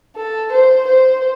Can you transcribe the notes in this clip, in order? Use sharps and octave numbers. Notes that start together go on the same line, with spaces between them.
A4
C5
C5